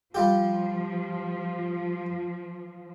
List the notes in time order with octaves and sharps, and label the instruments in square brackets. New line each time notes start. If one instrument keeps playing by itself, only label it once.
[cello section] F3 [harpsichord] G3 F4 G4